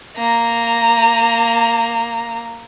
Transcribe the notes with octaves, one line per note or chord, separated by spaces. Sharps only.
A#3 A#5